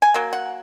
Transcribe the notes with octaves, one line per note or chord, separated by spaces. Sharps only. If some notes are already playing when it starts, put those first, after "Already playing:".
G#5
F#3 A#3
F#5